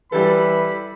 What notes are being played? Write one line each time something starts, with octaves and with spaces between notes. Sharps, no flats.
E3 G3 A4 B5